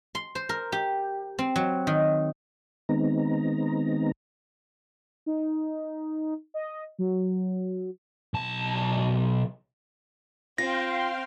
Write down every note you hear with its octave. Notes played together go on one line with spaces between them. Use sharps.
C6
C5
A#4
G4
C4
F#3
D#3
D#3 G#3 B3 C4 D#4 A#5
D#4
D#5
F#3
B1 A5
C4 F4 F5 G5 C6 A#6